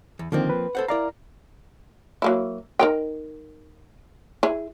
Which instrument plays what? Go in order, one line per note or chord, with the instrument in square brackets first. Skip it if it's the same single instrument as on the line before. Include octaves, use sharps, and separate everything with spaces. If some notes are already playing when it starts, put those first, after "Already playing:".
[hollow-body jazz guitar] E2
[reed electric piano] D3 D#3 [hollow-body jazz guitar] F3 A#3 C4
[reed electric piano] B4
[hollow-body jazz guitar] A4 C5 F#5
[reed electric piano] E4 D5 A#5 [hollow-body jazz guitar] A#4 F5
[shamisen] F#3 A#3 E4
D#4 A#4 G5
E4 G#4